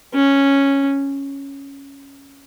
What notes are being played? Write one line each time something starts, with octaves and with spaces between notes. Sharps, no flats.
C#4